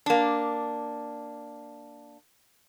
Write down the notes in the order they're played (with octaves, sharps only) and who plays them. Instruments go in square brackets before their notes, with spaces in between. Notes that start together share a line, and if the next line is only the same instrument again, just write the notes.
[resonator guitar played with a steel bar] A#3 D4